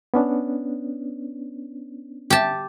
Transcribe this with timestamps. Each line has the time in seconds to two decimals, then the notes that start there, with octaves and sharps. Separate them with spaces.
0.14 B3 C#4 D4
2.30 G4 A5